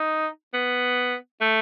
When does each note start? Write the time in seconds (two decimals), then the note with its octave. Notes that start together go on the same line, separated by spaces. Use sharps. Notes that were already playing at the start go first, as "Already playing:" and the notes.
Already playing: D#4
0.54 B3
1.41 A3